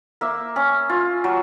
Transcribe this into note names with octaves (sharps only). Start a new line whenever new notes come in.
A#3 E5
C#4
F4
F#3